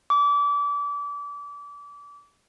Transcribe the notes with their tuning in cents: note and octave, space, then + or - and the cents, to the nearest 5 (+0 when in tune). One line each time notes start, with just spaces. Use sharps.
D6 -30